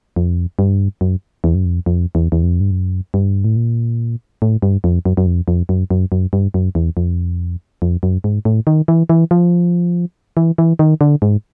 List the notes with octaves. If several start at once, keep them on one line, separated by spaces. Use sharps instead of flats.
F2
G2
F#2
E2
F#2
F2
F2
E2
E2
F2
G2
F#2
G2
A2
A#2
A2
G2
F2
F#2
F#2
F2
F2
F#2
F#2
F#2
G2
F#2
E2
F2
F2
F#2
G#2
A2
D#3
E3
E3
F3
E3
E3
D#3
D3
G#2